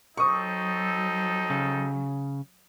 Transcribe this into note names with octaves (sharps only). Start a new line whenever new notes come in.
F#3 C4 D#4 A4 C#6 D#6
C#3